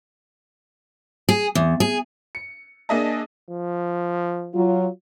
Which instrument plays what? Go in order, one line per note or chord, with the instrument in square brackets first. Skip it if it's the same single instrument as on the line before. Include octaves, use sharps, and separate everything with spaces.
[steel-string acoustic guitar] G#4
E2
G#4
[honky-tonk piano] C#7
A#3 D4 G#4 D#5 E5 A5
[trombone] F3
[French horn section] F#3 F4